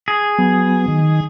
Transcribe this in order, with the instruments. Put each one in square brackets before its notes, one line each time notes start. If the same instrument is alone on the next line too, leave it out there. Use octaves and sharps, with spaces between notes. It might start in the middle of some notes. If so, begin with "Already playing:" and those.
[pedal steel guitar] G#4
[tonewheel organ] F#3 B3
D#3